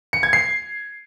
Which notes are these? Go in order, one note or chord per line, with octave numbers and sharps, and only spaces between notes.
C#7
G#6
C7